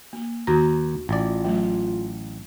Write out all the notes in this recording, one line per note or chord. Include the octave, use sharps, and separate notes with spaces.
A#3
D#2 F#4 A#5
A1 F4 D5
F#3 A3